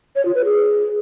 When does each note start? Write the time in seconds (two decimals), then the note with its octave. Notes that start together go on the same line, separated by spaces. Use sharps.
0.16 C#5
0.25 F4
0.35 B4
0.45 G#4